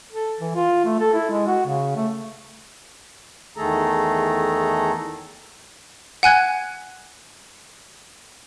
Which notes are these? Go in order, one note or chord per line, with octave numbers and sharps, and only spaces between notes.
A4
E3
F4
A3
A4
E4
G#3
F#4
C#3
A3
E2 D#3 A3 G#4 A4 A#5
F#5 G#5 F#6 G#6